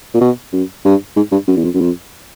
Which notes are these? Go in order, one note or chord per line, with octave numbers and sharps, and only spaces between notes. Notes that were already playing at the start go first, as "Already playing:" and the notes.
A#2
B2
F#2
G2
G#2
G2
F#2
E2
F2
F#2
F2